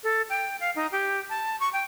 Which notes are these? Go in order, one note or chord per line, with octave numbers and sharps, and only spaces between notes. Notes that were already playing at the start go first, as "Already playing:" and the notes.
A4
G5
F5
D#4
G4
A5
C#6
G5